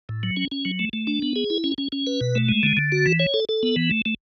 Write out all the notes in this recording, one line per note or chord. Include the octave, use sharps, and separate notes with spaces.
A2
F#3
C#4
C#4
F#3
A3
A3
D4
B3
G#4
E4
C#4
C#4
C#4
B4
B2
A3
G#3
D3
D3
F#4
E3
C#5
A4
A4
B3
E3
A3
A3